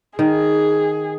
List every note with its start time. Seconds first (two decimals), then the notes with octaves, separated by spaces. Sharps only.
0.19 D#3 G#4